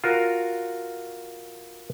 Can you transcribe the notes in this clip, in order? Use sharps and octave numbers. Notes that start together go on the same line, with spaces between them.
F4 F#4 A#4